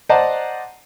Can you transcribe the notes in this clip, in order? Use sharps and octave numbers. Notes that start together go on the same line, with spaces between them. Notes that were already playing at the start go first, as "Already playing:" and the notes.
C5 D5 D#5 F#5 A5 A#5